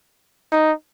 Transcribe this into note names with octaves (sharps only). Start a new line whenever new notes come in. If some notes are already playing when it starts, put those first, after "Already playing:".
D#4